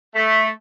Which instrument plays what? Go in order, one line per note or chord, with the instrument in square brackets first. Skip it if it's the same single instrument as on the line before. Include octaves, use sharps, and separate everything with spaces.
[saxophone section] A3